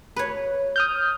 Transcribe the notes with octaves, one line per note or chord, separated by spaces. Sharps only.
B4 C#5
D#6 F6 G6